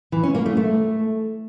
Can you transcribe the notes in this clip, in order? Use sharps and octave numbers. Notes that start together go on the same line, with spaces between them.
E3
C#4
A#3
A3
A3